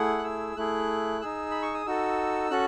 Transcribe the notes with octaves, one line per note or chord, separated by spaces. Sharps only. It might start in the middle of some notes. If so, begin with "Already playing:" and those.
Already playing: A3 E4 G#4 F#5
F#6
E6
A3 E4 G#4 F#6
D#4 G#4 E6
B5
C#6
D#6
D#4 F#4 A4 E6
C#4 F#4 A4 F#6